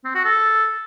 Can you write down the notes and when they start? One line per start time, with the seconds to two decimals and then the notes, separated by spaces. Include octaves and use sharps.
0.04 C4
0.15 F#4
0.25 A4